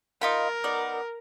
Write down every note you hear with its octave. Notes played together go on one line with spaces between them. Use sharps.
D#4 F4 A#4 B5
B3 D#4 D5